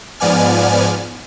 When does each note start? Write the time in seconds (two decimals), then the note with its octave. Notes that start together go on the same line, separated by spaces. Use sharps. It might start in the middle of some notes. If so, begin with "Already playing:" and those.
0.20 G#2 F3 B3 D5 G#5 F6